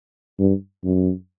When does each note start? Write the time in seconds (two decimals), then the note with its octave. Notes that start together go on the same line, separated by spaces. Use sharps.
0.39 G2
0.84 F#2